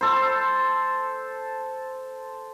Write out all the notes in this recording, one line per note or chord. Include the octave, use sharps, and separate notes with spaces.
A4 C5